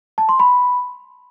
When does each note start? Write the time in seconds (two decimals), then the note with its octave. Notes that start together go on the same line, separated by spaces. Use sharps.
0.18 A5
0.29 C6
0.40 B5